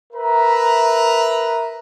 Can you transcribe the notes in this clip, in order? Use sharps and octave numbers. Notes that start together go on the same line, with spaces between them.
A#4 B4 E5 A#5